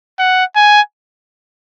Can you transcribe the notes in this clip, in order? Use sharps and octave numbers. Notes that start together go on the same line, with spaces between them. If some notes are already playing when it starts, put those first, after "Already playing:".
F#5
G#5